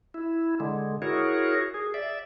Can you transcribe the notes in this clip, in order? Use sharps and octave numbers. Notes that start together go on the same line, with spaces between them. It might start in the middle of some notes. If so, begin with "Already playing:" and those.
E4
D3 G#3
E4 F#4 G#4 A#4 C#5
G#4
D5 E5